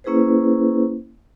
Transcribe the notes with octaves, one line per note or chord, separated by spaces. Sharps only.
A#3 C#4 E4 G#4 B4 C5